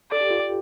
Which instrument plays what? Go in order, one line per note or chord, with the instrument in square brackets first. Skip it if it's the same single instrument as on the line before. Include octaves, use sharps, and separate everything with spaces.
[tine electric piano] A4 [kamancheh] D5
[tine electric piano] G4
F4
G4